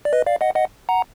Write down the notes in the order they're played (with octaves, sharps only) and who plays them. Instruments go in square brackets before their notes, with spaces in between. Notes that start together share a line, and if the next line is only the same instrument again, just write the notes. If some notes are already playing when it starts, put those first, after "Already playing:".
[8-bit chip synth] D5
B4 D#5
D5 F5
D#5 F#5
D#5 F#5
F#5 A#5